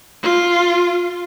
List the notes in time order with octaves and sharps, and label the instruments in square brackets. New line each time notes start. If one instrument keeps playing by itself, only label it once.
[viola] F4